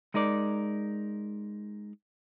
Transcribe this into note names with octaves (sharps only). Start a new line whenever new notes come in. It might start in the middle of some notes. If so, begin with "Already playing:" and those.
G#3 D#4 A#4 D5